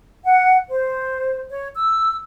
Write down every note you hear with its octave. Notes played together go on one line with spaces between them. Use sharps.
F#5
C5
C#5
E6